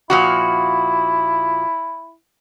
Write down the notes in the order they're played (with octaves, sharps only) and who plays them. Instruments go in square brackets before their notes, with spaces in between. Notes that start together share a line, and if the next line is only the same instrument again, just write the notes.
[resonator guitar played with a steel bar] A#2 F3 F#4 [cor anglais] E4